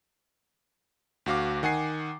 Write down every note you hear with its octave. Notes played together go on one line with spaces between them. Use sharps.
D2 F#4 F5 D6
D#3 F#5 G#5 C7